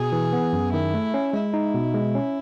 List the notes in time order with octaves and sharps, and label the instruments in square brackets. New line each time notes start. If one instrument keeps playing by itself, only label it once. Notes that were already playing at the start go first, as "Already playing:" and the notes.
Already playing: [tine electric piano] B2 [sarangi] G#4
[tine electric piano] E3
B3
F#2
[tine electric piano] D#3 [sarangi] E4
[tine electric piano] A3
C#4
[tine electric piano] G#3 [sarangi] E4
[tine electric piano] D#4
B2
G#3
C#4